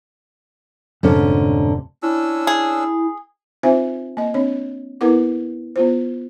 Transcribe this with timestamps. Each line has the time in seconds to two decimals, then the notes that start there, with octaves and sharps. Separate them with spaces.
1.03 F1 G#2 D3 C#4
2.03 C#4 D4 E4 E6
2.47 G#4
3.63 C4 D#4 F4 C5 E5 G#5
4.17 A#3 D#5
4.34 C4 D4 C#5
5.01 B3 E4 A#4 B4 F#5 D6
5.76 B3 F4 C5